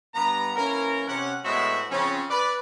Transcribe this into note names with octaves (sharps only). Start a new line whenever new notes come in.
G2 B3 A#5
E3 A#3 C#4 A#4
C3 C#4 F#5
A2 G#3 B3 F#4 C5 E5
C#3 F3 C4 C#4
B4 D5